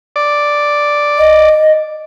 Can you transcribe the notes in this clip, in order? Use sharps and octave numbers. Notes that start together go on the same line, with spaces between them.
D5
D#5